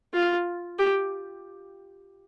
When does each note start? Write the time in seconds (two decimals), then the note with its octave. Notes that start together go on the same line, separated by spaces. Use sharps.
0.14 F4
0.79 G4